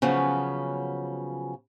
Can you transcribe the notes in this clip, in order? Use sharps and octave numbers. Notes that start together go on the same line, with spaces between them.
C#3 F3 F#3 B3 C#4